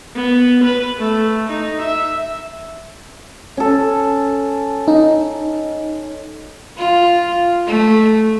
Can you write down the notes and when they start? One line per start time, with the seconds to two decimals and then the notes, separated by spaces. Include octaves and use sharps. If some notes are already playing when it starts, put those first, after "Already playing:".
0.15 B3
0.64 B4
0.98 A3
1.49 D#4
1.81 E5
3.57 C#4 A4
4.88 D#4
6.78 F4
7.67 A3